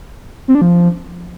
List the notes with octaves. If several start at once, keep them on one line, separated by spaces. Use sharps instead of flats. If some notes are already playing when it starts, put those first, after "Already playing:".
C4
D4
F3